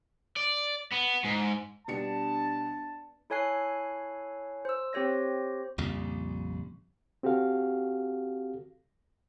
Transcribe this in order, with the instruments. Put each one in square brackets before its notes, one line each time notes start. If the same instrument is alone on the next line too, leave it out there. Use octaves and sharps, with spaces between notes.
[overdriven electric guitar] D5
B3
G#2
[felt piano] B2 G3 C#7 [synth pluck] B3 D4 [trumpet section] A5
[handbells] E4 A4 C#5 G#5 F#6 C7
C5 E6
C4 G4 C5 C#5 A#6
[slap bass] A#1 F2 C#3 G3
[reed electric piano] C4 F#4 G4 A4 F5